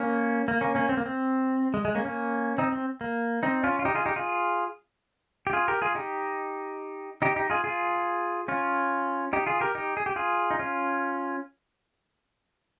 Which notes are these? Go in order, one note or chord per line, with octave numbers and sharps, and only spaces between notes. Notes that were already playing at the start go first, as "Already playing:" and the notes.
Already playing: A#3 C#4
A#3
A#3 C#4
A#3 C#4
C4
A#3
C4
G#3
G#3
A#3 C#4
A#3 C#4
C4 D#4
C4
A#3
C4 D#4
C#4 F4
F4
D#4 G4
F4 G#4
D#4 G4
F4 G#4
G4
F4 G#4
G4 A#4
F4 G#4
D#4 G4
D#4 G4
D#4 G4
F4 G#4
F4 G#4
C#4 F4
D#4 G4
F4 G#4
G4 A#4
D#4 G4
G#4
G4
F4 G#4
D#4
C#4 F4